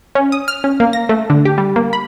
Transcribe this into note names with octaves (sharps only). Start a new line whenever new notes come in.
C#4
D#6
F6
C#4
A#3
A#6
A3
D3
G4
G3
A#3
B5